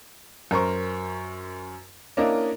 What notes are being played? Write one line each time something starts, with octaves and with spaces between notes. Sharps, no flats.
F#2 A#4 C5 C#6
A#3 C#4 D4 E4 A#4 D#5